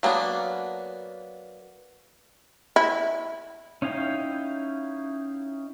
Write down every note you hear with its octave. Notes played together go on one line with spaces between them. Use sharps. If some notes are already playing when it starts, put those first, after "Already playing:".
F#3 A#3 B3 D4
E4
C#4 D#4 E4 F5 G5